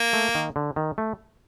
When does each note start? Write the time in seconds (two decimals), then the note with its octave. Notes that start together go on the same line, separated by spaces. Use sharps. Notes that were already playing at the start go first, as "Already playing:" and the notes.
Already playing: A#3
0.13 A3
0.35 D#3
0.56 D3
0.76 D#3
0.98 A3